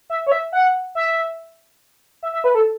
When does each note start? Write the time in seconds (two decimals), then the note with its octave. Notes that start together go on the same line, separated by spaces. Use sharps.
0.10 E5
0.27 C#5
0.32 E5
0.52 F#5
0.95 E5
2.23 E5
2.33 E5
2.44 B4
2.55 A4